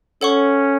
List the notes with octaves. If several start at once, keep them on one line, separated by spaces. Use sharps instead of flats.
C#4 A4 C#5 F#5 C#6